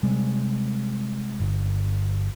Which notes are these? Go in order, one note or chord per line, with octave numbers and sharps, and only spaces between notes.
C3 G3 G#3
G1